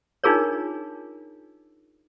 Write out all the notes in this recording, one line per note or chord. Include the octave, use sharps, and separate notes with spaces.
D4 D#4 F4 G#4 A#4 C#5